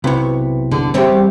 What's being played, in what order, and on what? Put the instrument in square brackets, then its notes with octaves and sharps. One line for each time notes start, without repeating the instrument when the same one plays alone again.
[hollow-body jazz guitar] B1 C3 E4 [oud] B4 C#5
[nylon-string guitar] D3
[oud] E3 G3 C#5 [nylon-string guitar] C4 G4